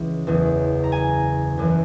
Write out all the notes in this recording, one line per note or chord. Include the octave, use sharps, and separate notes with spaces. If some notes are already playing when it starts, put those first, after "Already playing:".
Already playing: C#2 C#3 E3
F#1 E2 C#3
A#5
G#5
F#1 F#2 E3